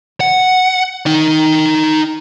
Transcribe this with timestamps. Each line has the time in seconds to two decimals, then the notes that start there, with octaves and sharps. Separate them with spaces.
0.21 F#5
1.06 D#4 G5